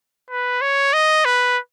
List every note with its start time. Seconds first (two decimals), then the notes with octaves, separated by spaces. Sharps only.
0.31 B4
0.62 C#5
0.94 D#5
1.25 B4